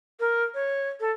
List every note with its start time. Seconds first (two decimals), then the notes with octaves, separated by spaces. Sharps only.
0.20 A#4
0.54 C#5
1.00 A4